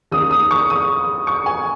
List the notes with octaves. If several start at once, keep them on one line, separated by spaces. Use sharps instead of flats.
D#2 D#3 D#6
D#6
C#6
D#6
C#6
G#5